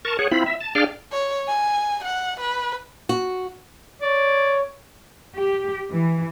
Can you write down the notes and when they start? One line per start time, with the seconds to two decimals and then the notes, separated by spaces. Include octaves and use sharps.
0.05 A#4 A5 C#6
0.19 G#4 C#5 F#5
0.31 C4 E4 F4 B5
0.46 E5
0.61 A5
0.75 D4 G#4 D5 F5 G5 F6
1.12 C#5
1.49 G#5
2.05 F#5
2.40 B4
3.09 F#4
4.02 C#5 D5
5.35 G4
5.92 E3